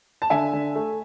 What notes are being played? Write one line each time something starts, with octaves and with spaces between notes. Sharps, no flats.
A5
D3 E5 G#5
D3
A3